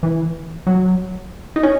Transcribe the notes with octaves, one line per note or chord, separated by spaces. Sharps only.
E3
F#3
D#4
C#4